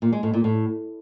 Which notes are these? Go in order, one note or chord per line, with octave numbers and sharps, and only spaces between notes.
A#2
G#3
A2
A#2
A2